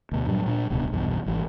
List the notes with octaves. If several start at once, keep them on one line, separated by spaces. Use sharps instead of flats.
D2 B2
G2 A#2 F3 F#3
A#2 D4
D1 C2 B2 D3
B1 E2 G2 E3
G#1 E3